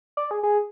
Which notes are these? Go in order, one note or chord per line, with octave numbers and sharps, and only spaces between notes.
D5
G#4
G#4